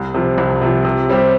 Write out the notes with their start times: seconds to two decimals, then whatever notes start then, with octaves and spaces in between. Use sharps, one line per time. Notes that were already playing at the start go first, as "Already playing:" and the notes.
Already playing: C2
0.14 C3 F3
0.38 C2
0.61 C3 F3
0.85 C3
1.09 G3 C4 G4